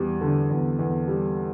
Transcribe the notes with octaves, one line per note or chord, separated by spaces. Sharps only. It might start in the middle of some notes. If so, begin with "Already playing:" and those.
Already playing: E2 G3
D3
E2
E2
G3